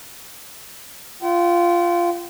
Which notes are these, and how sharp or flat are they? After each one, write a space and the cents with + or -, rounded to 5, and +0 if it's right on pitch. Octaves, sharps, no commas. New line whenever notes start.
F4 -10 G5 -45